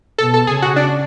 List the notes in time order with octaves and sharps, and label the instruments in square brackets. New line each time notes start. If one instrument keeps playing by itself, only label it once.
[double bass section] B2 [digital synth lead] A4
[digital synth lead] A4
[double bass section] C#3 [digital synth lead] G#4
[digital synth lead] F#4
D4